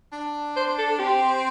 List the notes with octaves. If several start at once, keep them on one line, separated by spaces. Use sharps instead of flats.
D4
C5
A4
C4 G4